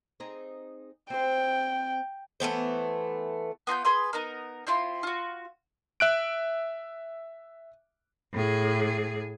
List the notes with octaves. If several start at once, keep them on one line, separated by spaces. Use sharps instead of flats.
C4 D#4 G#4
C4 C5 G5
E3 A3 B3 C5
B3 F4 A#5 G6
G#4 B4 C6 D#6
B3 D#4 A#4
C4 E4 F4 C6
F4 F#4
E5 F#6 D7
A2 G#4